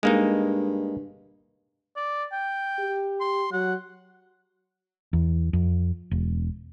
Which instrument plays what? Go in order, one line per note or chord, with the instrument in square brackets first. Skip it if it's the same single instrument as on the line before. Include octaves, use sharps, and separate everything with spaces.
[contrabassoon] G2 [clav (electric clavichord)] G#3 A#3 D#4
[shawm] D5
G5
[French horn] G4
[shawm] C6
[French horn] F#3 [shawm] F#5
[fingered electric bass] E2
F2
E1